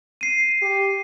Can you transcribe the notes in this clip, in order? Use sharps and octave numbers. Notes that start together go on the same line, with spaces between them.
C7 D#7
G4